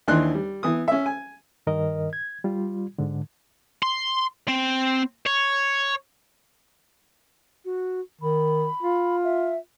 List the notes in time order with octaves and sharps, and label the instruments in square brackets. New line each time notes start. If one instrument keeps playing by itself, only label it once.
[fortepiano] D#2 E3 D4 D#4 C6 F#6
G3
E3 B3 D#6
C#4 E5
G#5
[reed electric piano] G2 D#3 A#4 D#5
G#6
G3 F4
G#2 D3
[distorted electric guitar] C6
C4
C#5
[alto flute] F#4
[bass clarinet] D#3 [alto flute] B5
[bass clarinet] F4
[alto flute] E5